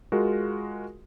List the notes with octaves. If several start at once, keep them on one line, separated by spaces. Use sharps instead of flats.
G#3 F4 F#4 A#4